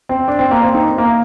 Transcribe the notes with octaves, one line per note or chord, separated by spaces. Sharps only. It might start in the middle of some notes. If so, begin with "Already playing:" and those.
C4
D4
C4
A#3
C4
D#4
A#3